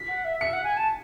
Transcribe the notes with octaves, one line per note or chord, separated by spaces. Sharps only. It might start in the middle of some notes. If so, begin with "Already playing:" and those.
Already playing: B6
F#5
E5
E5 C#7
F#5
G#5
A5